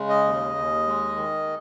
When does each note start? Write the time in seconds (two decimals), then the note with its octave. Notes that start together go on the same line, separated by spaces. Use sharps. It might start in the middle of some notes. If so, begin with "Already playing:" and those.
Already playing: C#3 G#3
0.09 D#5
0.24 D#2
0.55 D#2
0.87 G#3
1.17 D#3